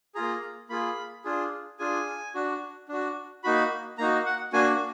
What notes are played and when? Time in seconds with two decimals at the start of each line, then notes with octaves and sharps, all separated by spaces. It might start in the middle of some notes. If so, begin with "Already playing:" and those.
0.15 A#3 F4 G#4 A#5
0.69 A#3 F4 G#4 B5
1.24 D4 F4 G#4
1.79 D4 F4 G#4 G#5
2.35 D4 F#4
2.88 D4 F#4
3.44 A#3 D#4 F#4 B5
3.98 A#3 D#4 F#4 A#5
4.26 F#5
4.53 A#3 D4 F#4 G#5